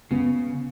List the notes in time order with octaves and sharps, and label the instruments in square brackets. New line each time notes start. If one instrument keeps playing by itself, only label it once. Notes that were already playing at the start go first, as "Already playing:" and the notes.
[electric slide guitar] C#3 [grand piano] B3